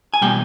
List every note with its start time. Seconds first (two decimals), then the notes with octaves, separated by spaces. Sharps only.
0.14 G#5
0.22 B2 G3 A#3 G5